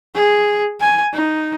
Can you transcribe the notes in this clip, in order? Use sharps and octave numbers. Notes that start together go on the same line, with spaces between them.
G#4
G#5
D#4